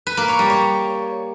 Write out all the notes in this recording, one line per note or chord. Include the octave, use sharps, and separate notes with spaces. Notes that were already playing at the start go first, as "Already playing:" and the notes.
B4
A#3
C#5
G3
C#5